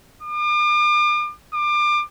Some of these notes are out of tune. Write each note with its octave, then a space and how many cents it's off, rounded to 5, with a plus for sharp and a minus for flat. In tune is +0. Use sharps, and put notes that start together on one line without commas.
D6 +40
D6 +30